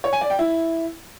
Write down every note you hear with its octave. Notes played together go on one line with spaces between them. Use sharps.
C#5
G#5
D5
G5
E4